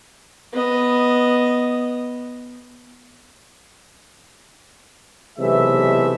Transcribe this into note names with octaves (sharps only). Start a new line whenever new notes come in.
B3 D#5
B1 C3 E3 G#3 A3 E5